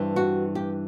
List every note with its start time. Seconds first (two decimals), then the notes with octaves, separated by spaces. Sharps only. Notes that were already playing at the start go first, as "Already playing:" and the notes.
Already playing: G2 E3 G3 C4
0.16 F#4
0.55 G4